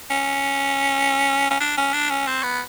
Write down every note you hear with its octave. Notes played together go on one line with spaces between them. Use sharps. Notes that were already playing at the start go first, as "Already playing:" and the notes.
C#4
C#4
D4
C#4
D4
C#4
C4
B3